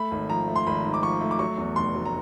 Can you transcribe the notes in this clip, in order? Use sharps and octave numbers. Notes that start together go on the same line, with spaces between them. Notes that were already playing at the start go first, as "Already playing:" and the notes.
Already playing: A3 B5
G#1
F3 A#5
A3
C6
G#1 B5
G#2
D6
F3 C#6
A3
D6
F#3 C#6
E2
F1 C6
F#3
A#5